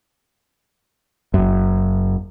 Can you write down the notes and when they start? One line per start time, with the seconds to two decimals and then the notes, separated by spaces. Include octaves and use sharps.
1.34 F#1 F#2